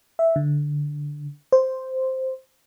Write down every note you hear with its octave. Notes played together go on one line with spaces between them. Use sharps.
E5
D3
C5